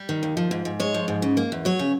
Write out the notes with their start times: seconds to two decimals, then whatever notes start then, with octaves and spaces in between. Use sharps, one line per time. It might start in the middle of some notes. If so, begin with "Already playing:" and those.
Already playing: G3
0.09 D#3
0.23 D#2
0.37 F3
0.51 G#2
0.65 G#2
0.80 G#3 C#5
0.94 F3
1.08 G#2
1.22 C#3
1.37 A#3
1.52 E2
1.65 F#3 C#5
1.79 C#3